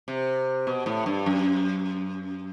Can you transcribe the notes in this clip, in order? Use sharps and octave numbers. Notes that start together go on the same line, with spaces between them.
C3
B2
A2
G2
F#2